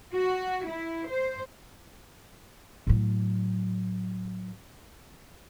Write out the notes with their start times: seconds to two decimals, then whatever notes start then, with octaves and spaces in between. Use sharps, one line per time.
0.13 F#4
0.67 E4
1.08 C5
2.87 A2 F#3